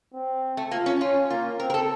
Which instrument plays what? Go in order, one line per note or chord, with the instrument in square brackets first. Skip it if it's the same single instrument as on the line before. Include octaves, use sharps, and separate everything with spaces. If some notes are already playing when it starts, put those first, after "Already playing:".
[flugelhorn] C4
[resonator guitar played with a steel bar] A3
[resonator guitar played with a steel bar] A#3 [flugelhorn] F4
[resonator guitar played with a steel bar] C#4
[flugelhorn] C#4 [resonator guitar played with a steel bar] F4
[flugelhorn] A#3 [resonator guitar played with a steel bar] F4
[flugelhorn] C4 [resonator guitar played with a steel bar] A#4
[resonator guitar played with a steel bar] A#4
A4